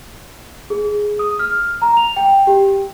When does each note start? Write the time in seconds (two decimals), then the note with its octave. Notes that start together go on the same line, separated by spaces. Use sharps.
0.70 G#4
1.19 D#6
1.39 F6
1.82 A#5
1.97 F7
2.16 G5
2.47 G4